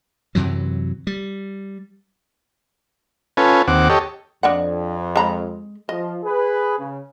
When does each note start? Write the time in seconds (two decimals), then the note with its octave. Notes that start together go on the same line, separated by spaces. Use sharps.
0.35 F#2 C3 E3 F#3
1.07 G3
3.37 C#4 F4 A4 B4 G#5
3.68 D#2 C4 F#5 D6
3.90 G4 A4 C#5 D#5
4.43 F2 D4 D#5 F#5
5.16 G#3 A#5 B5
5.89 F3 D#5
6.23 G#4 B4
6.79 C#3